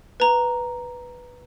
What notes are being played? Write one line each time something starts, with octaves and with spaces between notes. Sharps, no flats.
B4 A#5